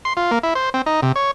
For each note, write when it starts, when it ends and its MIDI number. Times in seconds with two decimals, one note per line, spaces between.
0.05 0.13 84
0.17 0.31 65
0.31 0.39 58
0.43 0.54 64
0.55 0.70 72
0.74 0.82 60
0.86 1.00 63
1.03 1.12 48
1.16 1.31 73